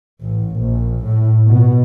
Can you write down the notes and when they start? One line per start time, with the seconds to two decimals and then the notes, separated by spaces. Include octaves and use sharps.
0.22 A1
0.58 A#1
1.05 A2
1.47 B2